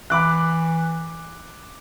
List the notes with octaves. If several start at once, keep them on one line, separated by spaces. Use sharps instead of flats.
E3 B5 D6 F#6